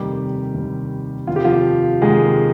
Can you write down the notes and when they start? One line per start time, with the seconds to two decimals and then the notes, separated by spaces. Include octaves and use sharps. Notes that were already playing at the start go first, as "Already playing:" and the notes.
Already playing: F1 D#2 D#3 G3 G4
0.54 F1 D#2 D#3
1.27 F1 D#2 D#3 F4
1.36 G4
1.44 F3 F4
2.02 F1 D#2 D#3 G#3 G#4